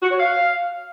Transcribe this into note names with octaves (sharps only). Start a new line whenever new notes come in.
F#4
C#5
F5